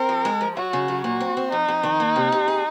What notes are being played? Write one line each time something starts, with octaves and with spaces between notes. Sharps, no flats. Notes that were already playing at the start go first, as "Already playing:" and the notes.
Already playing: C4 A#4
F3
G#3
F3
F#3 F#4
C#3
F#3
A#2 F#4
C4
C4
F2 D#4
F2
D#3
A#3
C3
C3
G#4